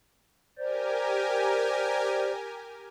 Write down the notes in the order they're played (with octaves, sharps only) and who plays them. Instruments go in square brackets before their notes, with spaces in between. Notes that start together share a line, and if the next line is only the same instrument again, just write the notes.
[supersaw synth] G4 A#4 G#5 [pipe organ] C5 D5